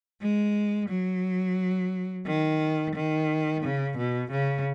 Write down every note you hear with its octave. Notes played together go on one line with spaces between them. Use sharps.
G#3
F#3
D#3
D#3
C#3
B2
C#3